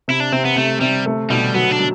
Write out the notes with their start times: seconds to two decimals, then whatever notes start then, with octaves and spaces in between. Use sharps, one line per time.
0.08 C3 E4
0.20 D4
0.32 C3 C4
0.45 B3
0.56 C3 A3
0.81 C3 G3
1.06 A3
1.30 B2 G3
1.54 F#3 B3
1.71 D4
1.79 F#3